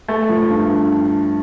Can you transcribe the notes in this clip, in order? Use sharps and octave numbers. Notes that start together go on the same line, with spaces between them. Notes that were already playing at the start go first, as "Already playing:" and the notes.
A3
F3
G2